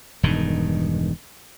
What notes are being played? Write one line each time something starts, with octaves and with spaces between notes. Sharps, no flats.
E1 G2 D#3